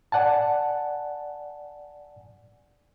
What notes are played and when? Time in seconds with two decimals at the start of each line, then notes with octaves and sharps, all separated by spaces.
0.12 D5 F#5 G#5 A5